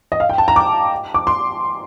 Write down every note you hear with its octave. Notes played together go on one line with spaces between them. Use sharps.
D#5
F5
G5
A5
A#5
D6
D6
C6